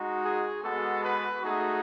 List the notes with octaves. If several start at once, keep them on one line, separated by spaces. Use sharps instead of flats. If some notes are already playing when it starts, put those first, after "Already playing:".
Already playing: G#3 D#4 F#4
G#4
G#3 B3 F#4 A4
B4
A3 D#4 F#4 G#4